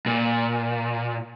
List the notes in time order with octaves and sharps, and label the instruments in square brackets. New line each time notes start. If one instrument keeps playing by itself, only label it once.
[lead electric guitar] A#2